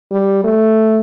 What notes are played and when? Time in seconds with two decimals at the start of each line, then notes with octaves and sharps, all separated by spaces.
0.12 G3
0.44 A3